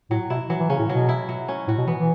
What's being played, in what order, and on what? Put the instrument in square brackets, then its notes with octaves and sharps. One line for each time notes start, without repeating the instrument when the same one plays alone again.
[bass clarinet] A2 [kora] F#3
[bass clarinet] B2 [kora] E4
[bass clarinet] E3 [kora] F#3
[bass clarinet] E3
[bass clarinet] C#3 [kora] C#4
[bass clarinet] A2
[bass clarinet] B2 [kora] F#3
[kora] E4
F#3
C#4
[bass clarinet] A2 [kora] F#4
[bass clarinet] B2
[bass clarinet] E3 [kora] B3
[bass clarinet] E3